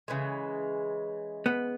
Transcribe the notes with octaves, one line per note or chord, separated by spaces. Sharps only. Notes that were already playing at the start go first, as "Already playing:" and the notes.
C#3 E3 G#3
B3